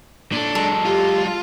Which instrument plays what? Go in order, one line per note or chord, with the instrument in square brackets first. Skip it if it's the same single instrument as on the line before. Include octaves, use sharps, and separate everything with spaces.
[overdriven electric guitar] A#2 A4 [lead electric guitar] D4
[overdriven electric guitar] F#3 G#3 [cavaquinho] A4
[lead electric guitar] F4 [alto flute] G4